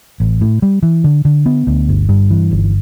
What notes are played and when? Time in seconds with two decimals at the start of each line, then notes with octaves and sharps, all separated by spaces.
0.20 A1
0.41 A2
0.62 G3
0.83 E3
1.04 D3
1.25 D3
1.46 B3
1.67 D2
1.89 G1
2.09 G2
2.30 E3
2.51 G1